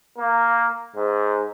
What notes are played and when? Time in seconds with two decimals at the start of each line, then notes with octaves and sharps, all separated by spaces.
0.18 A#3
0.95 G#2